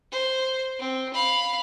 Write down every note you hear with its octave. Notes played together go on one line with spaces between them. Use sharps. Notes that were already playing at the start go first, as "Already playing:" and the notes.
C5
C4
F5 B5